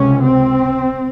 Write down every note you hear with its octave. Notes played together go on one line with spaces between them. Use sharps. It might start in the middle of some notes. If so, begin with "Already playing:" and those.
Already playing: C#2 C3 C#4
C4